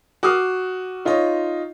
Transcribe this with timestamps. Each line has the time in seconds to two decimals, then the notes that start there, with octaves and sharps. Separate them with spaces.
0.23 F#4 D6 D#6 F6 C7
1.05 D#4 F4 C#5 D#5